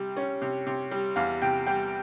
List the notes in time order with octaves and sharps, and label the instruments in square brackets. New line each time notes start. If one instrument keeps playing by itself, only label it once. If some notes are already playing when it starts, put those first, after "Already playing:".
Already playing: [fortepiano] C3 G3
C#4
C3
C3
G3
E2 F5
C3 G5
G3 G5